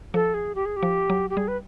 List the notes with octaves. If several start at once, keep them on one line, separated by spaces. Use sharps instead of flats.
F3 A4
G#4
G4
G#4
G4
F3
F#3
G4
G3 G#4
B4